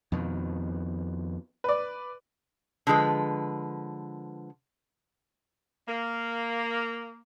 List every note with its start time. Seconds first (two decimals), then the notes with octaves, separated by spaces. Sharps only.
0.12 F2 B2 D#3
1.64 B4 D5
2.87 D3 F3 G#3 B4
5.88 A#3